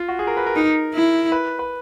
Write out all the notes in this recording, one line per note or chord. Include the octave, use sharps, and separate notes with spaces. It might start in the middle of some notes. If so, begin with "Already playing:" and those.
Already playing: F4
F#4
G#4
A#4
B4
A#4
D#4
E4
B4
B4